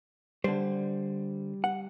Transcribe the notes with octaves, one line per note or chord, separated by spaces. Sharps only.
D3 G3 C5
F#5